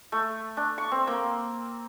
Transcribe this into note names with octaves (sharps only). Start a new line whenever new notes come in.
A3
D4
C#6
C4
A#3